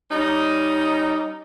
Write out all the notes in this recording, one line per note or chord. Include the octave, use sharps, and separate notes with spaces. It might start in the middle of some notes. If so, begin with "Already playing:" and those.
G3 C#4 D#4